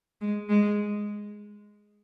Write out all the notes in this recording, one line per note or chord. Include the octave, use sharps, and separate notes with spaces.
G#3
G#3